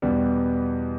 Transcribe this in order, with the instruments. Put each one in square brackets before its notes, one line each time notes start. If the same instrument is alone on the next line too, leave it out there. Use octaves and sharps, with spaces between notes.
[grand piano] E2 B2 G3 B3